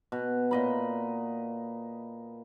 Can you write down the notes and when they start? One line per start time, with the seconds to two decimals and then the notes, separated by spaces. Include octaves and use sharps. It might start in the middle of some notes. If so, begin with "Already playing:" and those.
0.12 B2
0.51 A#2 D#5 B5